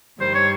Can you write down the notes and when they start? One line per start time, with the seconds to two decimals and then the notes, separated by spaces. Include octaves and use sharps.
0.20 G2 D#3 G3 C5
0.34 C#5